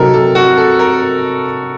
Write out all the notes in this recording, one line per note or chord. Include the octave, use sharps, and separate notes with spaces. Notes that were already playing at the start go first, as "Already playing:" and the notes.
Already playing: C3 F#3 C4 D#4 A4 A#4
A4
F#4
A4
A#4